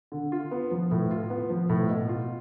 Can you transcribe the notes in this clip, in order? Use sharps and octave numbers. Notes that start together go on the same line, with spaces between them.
D3
F4
B3
F3
A2
F4
B3
F3
A2
B2
F4